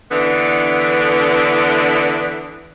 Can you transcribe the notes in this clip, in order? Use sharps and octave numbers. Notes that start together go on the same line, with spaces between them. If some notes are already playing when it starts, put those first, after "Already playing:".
D3 E3 B3 D4